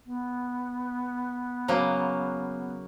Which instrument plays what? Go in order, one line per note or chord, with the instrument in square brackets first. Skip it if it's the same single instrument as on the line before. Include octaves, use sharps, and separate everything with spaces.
[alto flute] B3
[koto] C#3 F#3 A#3